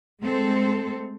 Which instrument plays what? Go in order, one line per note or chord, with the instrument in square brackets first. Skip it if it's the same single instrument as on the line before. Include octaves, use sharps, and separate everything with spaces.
[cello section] G#3 A3 C4 A4 C5